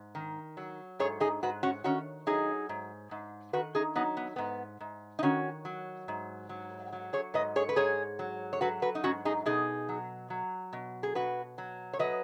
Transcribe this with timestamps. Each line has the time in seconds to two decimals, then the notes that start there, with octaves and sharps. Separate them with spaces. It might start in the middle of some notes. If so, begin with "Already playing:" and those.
Already playing: G#2
0.15 D#3
0.57 F#3
0.99 G#2 G#4 C#5
1.20 D#4 G#4
1.43 G#2 F#4 B4
1.63 C#4 F#4
1.84 D#3 C#4 F#4
2.27 F#3 D#4 G#4
2.69 G#2
3.11 G#2
3.53 D#3 F#4 B4
3.75 D#4 G#4
3.96 F#3 B3 D#4
4.17 B3
4.36 G#2 B3
4.80 G#2
5.19 D#4
5.23 D#3 C#4 F#4
5.65 F#3
6.08 G#2
6.49 F#3
6.93 F#3
7.13 G#4 C#5
7.34 G#2 B4 D#5
7.56 G#4 C#5
7.69 B4
7.76 G#2 G#4 C#5
8.19 F#3
8.53 C#5
8.61 F#3 F#4 B4
8.82 F#4 B4
8.95 D#4
9.04 G#2 C#4 F#4
9.25 D#4 G#4
9.46 B2 D#4 G#4
9.89 F#3
10.30 F#3
10.73 B2
11.03 G#4
11.15 B2 F#4 B4
11.58 F#3
11.93 C#5
11.99 F#3 B4 D#5